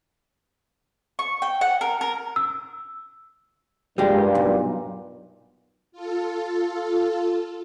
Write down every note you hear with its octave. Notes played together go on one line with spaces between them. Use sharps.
C#6
G5
F#5
A#4
A#4
E6
G2 A#2 G3 G#3 G4
B1
F4 A4